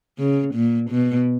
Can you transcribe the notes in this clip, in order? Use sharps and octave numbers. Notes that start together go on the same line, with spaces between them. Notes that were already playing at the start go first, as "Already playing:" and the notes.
C#3
A#2
B2